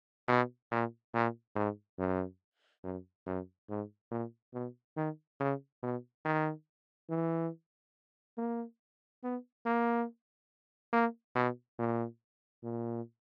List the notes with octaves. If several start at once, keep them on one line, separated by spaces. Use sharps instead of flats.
B2
A#2
A#2
G#2
F#2
F#2
F#2
G#2
A#2
B2
D#3
C#3
B2
D#3
E3
A#3
B3
A#3
A#3
B2
A#2
A#2